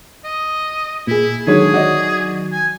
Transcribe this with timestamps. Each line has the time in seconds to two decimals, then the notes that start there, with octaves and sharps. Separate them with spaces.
0.25 D#5
1.07 A#2 E4 G#4
1.47 D3 D#3 F#3 G#3 G#4 C#5
1.74 F#4 D5 D#5
2.53 G#5